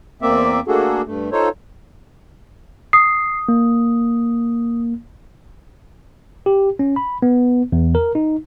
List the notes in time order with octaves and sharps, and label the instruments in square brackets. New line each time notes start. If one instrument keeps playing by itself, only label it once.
[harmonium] E2 A#3 C4 D5 E5
A3 A#3 D4 F#4 G#4 A4
G2 A3
D#4 F4 A4 C5 C#5
[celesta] D#6 [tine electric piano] C7
[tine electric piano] A#3
G4
C#4
B5
B3
E2
A#4
D#4